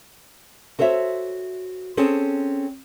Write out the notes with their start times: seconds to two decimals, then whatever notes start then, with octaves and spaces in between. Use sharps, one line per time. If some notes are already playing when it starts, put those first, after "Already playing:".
0.79 F#4 A4 C5 C#5 E5
1.97 C4 C#4 G#4 A4